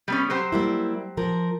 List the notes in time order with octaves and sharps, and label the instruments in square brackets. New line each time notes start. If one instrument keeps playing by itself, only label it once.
[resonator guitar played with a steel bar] G3 B3 C#4
F#3 G4 C5
[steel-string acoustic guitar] G3 A#3 E4
F3 A#4